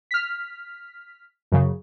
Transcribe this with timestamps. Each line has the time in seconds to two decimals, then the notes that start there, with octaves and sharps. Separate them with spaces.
0.11 F6 B6
1.52 F#2 C#3